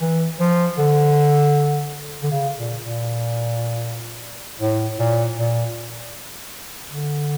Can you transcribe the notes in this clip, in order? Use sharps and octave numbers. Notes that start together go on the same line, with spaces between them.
E3
F3
D3
D3
C#3
A#2
A#2
A2
A#2
A#2
D3